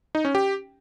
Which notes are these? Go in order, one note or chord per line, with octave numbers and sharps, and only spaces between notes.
D#4
C#4
G4